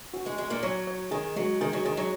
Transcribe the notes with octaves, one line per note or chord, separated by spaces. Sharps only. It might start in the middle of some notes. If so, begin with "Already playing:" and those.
F#4
G#3 G#4
G#3 F#4 G#4
A#2 A#3
F#3 C#5
C#5
D#3 G#4
F#3 G#3
D#3 G#4
F#3
D#3 G#4
F#3